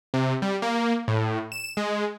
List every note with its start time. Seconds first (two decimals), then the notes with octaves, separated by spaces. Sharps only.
0.14 C3
0.42 G3
0.62 A#3
1.08 A2
1.52 E7
1.77 G#3